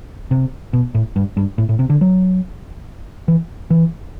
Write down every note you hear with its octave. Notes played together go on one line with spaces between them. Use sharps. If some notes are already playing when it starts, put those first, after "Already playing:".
C3
B2
A2
G2
G2
A2
A2
C3
D3
F#3
E3
E3